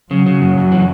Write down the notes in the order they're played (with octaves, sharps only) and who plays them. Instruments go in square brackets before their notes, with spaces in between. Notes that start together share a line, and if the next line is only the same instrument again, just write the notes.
[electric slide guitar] C#3 [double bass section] F#3
[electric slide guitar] C#3
F#2
F#2
E3